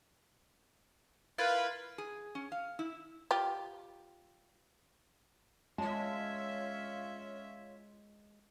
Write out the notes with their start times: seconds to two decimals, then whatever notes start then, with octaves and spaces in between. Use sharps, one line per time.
1.38 E4 F4 A#4 B4 F5
1.98 G#4
2.35 C#4
2.52 F5
2.79 E4
3.31 F4 G4
5.78 G#3 C#4 F4 C#5 E5 A5